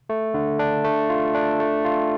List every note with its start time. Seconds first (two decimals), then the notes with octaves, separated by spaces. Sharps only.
0.09 A3
0.34 D3
0.59 D4
0.84 A3
1.10 F4
1.35 D4
1.60 A3
1.85 F4